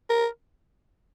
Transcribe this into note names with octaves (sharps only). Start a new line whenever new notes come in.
A#4